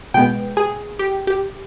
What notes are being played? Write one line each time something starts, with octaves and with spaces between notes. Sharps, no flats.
B2 G#3 B3 G5
G#4
G4
G4